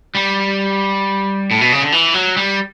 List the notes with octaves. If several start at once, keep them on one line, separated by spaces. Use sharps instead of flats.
G3
A2
B2
C#3
D3
E3
F#3
G3